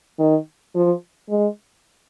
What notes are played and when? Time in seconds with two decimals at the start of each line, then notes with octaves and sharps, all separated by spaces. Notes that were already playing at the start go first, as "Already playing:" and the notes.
0.19 D#3
0.75 F3
1.30 G#3